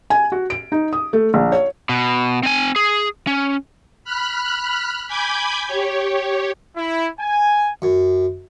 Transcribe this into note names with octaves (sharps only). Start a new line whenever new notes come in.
G#5
F#4
D7
D#4
D#6
A3
A#1
C#5
B2
C4 G#5
G#4
C#4
B5 F6 F#6
G#5 B5 D6 G6 G#6
G4 C#5
E4
G#5
F#2